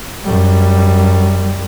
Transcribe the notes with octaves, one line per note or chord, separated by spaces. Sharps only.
F#2 G3